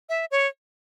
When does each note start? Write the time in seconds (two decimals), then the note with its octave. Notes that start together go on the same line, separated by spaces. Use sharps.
0.09 E5
0.31 C#5